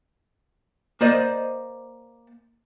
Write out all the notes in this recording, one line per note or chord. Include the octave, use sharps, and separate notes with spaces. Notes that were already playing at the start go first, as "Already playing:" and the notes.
A#3 C5 D5 D#5